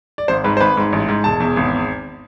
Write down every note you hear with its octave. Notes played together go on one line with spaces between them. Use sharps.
D5
G#1 C5
G#2 B4
C5
G#1 B4
G#2
A1
G#2
E1 A5
E2
G#1